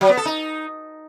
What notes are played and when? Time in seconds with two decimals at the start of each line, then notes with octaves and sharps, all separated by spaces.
0.01 F#3
0.09 B3
0.17 A4
0.25 D#4